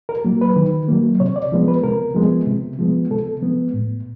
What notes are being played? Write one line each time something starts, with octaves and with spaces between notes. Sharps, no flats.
A#4
F#3 A#3
B4
D#3
F#3 A#3
C3 C#5
D5
F3 G#3 B3
B4
C3 A#4
F3 G#3 B3
C3
F3 G#3 B3
C3 A4
F3 G#3 B3
A2